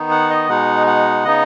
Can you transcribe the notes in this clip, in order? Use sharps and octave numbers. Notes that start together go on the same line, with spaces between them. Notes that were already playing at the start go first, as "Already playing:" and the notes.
Already playing: D#3 B3 D#4
F#5
D#5
B2 G#3 D#4 F#5
F#5
C#3 B3 D#4 D#5